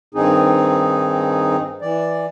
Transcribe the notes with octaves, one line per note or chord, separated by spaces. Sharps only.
G2 D#3 C4 D#4 G#4
E3 D5